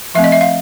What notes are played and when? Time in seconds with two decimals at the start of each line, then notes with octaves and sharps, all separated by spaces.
0.15 F3 A3 C4 E5
0.24 D#5
0.32 E5
0.41 F5